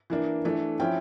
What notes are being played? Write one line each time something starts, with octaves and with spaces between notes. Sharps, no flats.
E3 A#3 D4
E3 A3 D4
F3 C#4 E4 G5